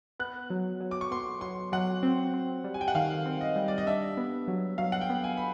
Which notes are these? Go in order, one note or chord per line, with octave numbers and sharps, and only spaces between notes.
B3 F#6
F#3
F#3
D6
C#6
B3 C6
F#3 C6
F#3 F#5
C4
C4
G3
G#5
G5
F#5
D#3 F5
C4
D#5
G3
D5
D#5
D4 E5
B3
F#3
F#3 F5
F#5
G5
B3
G#5
B5